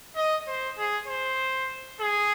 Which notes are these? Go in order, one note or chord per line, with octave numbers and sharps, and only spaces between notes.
D#5
C5
G#4
C5
G#4